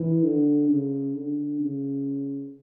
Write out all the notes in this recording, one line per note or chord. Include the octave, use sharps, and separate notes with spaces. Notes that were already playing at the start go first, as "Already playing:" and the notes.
Already playing: E3
D3
C#3
D3
C#3